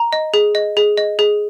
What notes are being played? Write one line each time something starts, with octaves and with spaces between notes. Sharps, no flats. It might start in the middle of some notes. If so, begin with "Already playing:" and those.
Already playing: A#5
D#5
G#4
D#5
G#4
D#5
G#4